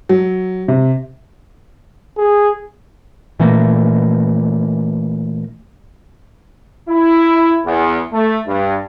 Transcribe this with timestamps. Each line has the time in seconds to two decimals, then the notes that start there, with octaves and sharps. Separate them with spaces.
0.09 F#3
0.68 C3
2.17 G#4
3.40 A#2 E3 A3 A#3
6.89 E4
7.65 E2
8.12 A3
8.47 G2